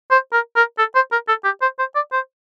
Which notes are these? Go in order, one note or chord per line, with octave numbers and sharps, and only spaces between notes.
C5
A#4
A#4
A4
C5
A#4
A4
G4
C5
C5
D5
C5